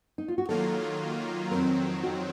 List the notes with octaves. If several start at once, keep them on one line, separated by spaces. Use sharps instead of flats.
D#4
F4
F#4
D#3 F#3 A#3 F4 A4
F2 D#3 F#3 C4 A#4
F#4